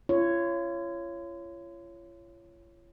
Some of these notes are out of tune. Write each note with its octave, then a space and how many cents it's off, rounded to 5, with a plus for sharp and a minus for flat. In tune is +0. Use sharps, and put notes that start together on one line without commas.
F4 -40 C#5 +0